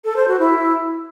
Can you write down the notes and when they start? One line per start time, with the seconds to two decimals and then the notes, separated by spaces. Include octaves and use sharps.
0.04 A4
0.16 C5
0.28 F#4
0.39 E4